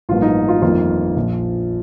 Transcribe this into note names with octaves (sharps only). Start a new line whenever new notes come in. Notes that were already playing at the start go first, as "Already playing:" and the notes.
A1 G2 F3 A#3 F4
D#4
F4
G1 F2 D#3 A#3 F4
A#1 A#2 F3